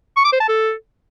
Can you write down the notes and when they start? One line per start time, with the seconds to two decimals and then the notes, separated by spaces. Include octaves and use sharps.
0.17 C#6
0.25 D6
0.33 C5
0.40 A5
0.48 A4